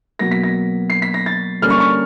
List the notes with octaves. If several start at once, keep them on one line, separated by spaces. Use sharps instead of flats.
B2 F#3 A#3 A#6
B6
A#6
C7
B6
A#6
A6
D3 G3 A#3 C#4 F6
C#6
C#6